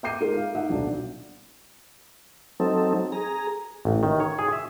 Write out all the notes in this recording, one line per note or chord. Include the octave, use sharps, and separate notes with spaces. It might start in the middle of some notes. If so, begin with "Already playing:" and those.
E5 G5 D6 G6 C7 D#7
G#3 D#4 F4 G#4 A#4 E5
F5
D#4 E5 F#5
D#1 B1 D4
F#3 C4 D#4 A4
G#4 A#5
A1
D#3
C#5
G#4
E5